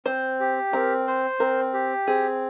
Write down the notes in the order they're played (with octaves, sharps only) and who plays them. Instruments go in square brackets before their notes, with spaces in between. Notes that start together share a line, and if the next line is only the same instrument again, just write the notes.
[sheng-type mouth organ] C4 [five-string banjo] C5
[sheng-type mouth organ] G4
[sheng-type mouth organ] C4 [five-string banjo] A#4
[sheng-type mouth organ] C5
[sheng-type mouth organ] C4 [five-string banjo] A#4
[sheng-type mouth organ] G4
[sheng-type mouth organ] C4 [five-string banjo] G#4